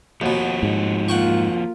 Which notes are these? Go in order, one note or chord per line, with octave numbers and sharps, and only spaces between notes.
D#2 B2 F3 C4 F#4
G#2
A#3 F4 F#5 G5 C#6